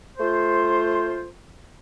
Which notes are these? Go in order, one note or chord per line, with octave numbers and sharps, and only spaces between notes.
A3 F4 C5